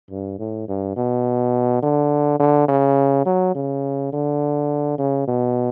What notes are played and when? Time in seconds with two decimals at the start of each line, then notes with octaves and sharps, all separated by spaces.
0.10 G2
0.39 A2
0.68 G2
0.96 B2
1.83 D3
2.39 D3
2.68 C#3
3.26 F#3
3.55 C#3
4.13 D3
4.98 C#3
5.27 B2